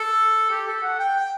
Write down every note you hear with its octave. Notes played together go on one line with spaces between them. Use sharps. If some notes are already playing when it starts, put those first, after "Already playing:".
Already playing: A4
G4
A4
F#5
G5
G5